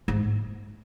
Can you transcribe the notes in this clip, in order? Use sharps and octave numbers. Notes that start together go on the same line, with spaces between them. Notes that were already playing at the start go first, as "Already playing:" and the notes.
G#2